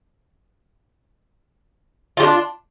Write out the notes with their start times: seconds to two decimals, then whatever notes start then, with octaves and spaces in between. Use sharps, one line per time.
2.17 F4
2.20 G4
2.23 D4